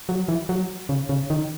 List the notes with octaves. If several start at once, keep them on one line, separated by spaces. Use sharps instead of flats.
F#3
E3
F#3
C#3
C#3
D#3